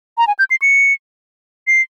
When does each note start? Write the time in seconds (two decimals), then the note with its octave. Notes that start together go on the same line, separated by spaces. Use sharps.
0.18 A#5
0.27 G#5
0.39 G6
0.51 C7
0.62 C#7
1.67 C7